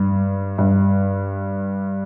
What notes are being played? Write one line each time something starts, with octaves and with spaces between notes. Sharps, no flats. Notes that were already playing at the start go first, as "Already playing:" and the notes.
Already playing: G2
G2